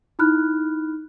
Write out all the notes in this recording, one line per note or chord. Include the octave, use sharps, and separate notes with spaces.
D#4 E4 B5 F6 F#6